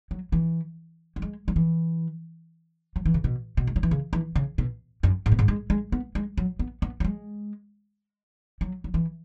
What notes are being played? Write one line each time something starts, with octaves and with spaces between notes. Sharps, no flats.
F#3
E3
F#3
G#3
F#3
E3
F#3
E3
C#3
B2
B2
G#3
F#3
E3
C#3
E3
C#3
B2
F#2
G#2
B2
G#2
G#3
G#3
B3
G#3
F#3
B3
B3
F#3
G#3
F#3
F#3
E3